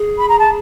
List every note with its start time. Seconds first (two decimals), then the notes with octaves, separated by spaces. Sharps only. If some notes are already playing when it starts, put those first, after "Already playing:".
Already playing: G#4
0.18 B5
0.29 A#5
0.39 A5